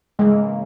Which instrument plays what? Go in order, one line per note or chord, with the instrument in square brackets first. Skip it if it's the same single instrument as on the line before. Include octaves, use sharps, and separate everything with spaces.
[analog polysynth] C#3 E3 A#3 [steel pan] G#3